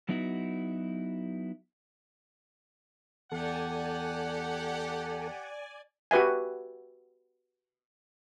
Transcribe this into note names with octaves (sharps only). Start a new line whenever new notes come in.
F#3 B3 D#4 E4 F#4
E2 G4 A4 D5 F#5 G#5
F#4 G4 B4 E5 G#5